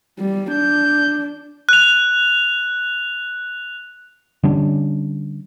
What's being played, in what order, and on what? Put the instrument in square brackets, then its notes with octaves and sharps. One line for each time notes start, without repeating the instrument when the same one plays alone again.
[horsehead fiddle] G3
[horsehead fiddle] D4 [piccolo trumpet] G6
[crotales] F#6 F7
[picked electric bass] D3 G3 C#4 D4